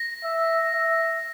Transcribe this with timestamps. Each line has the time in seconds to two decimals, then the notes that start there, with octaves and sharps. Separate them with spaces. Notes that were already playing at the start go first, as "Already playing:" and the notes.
Already playing: A#6
0.24 E5
0.73 E5